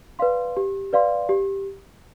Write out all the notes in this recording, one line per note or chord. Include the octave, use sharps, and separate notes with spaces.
B4 D5 F5 C6
G4
B4 D5 F5 C6
G4